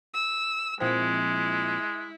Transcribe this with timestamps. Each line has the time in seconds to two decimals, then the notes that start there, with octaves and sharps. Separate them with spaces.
0.14 E6
0.80 A#2 F3 G#3 C4 E4